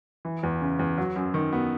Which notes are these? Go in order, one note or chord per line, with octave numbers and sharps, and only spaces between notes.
E3
E2
C#3
E2
F#3
F#2
D#3
B3